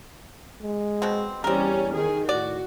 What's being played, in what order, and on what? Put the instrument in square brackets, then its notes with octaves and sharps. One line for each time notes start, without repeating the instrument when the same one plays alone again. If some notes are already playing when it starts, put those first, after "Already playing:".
[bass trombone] G#3
[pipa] B2 C4
[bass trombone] E2 [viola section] G3 C#4 [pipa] C4 A#4
[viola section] D#3 G#4
[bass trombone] A2 [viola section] F#4 [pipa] D5